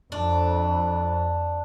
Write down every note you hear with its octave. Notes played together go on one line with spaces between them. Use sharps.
F2 D4